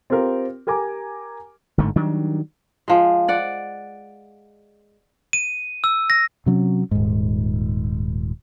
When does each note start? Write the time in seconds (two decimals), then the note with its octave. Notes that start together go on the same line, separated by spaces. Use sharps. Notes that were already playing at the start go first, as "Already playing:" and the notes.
0.10 C4 F4 G4 A#4
0.67 G4 A#4 G#5 A#5 D6
1.78 G1 G#2 D3 A3
1.96 D#3 F#3 G3 D4
2.88 F3 G#3
3.28 D5 F#5
5.33 D#7
5.84 E6
6.10 A#6
6.46 C3 F#3 C#4
6.91 D#1 G#2